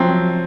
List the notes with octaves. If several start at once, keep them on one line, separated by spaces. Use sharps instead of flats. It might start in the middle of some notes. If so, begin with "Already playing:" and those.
Already playing: F3 F#3 C4